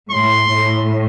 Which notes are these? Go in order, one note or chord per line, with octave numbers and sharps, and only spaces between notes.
A2 C6
A2